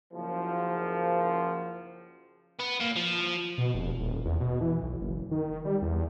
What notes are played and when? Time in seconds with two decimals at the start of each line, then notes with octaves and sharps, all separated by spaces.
0.13 F#1 F3
2.60 B3
2.80 A#2
2.96 F3
3.58 B2
3.74 F1
3.99 D#1
4.25 E2
4.40 B2
4.61 E3
4.82 B1
5.00 F#1
5.31 D#3
5.65 G3
5.82 E2